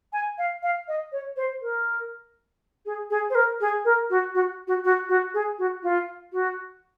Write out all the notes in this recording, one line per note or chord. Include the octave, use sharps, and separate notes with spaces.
G#5
F5
F5
D#5
C#5
C5
A#4
G#4
G#4
C5
A#4
G#4
A#4
F#4
F#4
F#4
F#4
F#4
G#4
F#4
F4
F#4